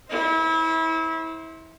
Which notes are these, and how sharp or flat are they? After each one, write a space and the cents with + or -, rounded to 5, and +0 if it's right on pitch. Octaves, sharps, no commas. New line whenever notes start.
E4 -30 C5 +15